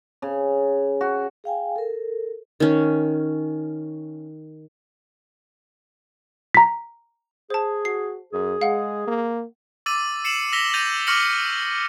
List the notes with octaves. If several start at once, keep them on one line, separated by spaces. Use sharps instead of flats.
C#3
F#4
G#4 F5 G5 G#5
A4 A#4
D#3 C#4
A#5 B6
G#4 C5 A5
F#4 C7
F#2 G#4
G#3 F5 F#5
A#3
D6 E6 A6 D#7
C7 C#7 E7 F#7
E6 A#6 B6 F7 G7
G6 A6 A#6 D#7 F7
C#6 D6 F6 A#6 C#7 F#7